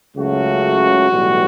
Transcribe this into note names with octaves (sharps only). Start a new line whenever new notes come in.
C#2 C#3 F#3 A3 F#4
B1 A2 E3 G3